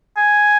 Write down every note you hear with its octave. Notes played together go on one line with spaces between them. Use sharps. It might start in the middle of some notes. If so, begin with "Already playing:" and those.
G#5